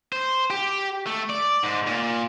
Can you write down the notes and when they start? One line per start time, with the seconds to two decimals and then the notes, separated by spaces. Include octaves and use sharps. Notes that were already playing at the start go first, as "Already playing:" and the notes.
0.12 C5
0.50 G4
1.07 A3
1.30 D5
1.64 G#2
1.87 A#2